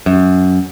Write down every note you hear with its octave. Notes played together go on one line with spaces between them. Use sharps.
F#2